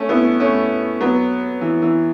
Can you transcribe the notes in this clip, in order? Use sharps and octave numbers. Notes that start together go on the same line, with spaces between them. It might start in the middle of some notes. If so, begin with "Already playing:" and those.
Already playing: A3 C#4
B3 E4
A3 C#4
F#3 B3
E3
E3